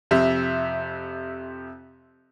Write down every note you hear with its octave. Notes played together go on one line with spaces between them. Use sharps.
F2 C3 E5